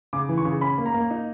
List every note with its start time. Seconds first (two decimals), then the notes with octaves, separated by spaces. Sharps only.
0.13 C#3 D6
0.29 E3
0.38 C#6
0.45 C#3
0.61 C#4 B5
0.78 A#3
0.86 A#5
0.94 A#3
1.11 D#4